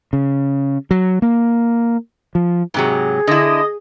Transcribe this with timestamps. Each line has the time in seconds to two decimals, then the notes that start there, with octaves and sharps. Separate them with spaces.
0.13 C#3
0.91 F#3
1.22 A#3
2.35 F3
2.74 G#2 C3 F#3 G#4
3.27 D3 E4 D#5